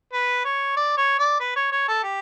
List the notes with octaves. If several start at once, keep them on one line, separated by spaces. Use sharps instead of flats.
B4
C#5
D5
C#5
D5
B4
C#5
C#5
A4
G4